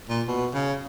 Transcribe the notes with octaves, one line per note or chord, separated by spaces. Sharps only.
A#2
B2
C#3